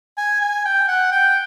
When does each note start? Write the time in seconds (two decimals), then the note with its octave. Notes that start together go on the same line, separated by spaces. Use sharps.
0.18 G#5
0.41 G#5
0.65 G5
0.88 F#5
1.11 G5